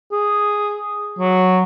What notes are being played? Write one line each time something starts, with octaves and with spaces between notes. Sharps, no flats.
G#4
F#3